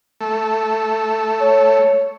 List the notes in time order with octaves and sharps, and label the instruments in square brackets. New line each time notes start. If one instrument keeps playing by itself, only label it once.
[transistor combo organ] A3
[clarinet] C#5